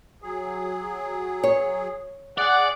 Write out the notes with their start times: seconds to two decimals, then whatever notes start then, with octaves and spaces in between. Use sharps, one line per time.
0.22 F#3 G#4
1.44 C#5
2.38 G#4 D5 F#5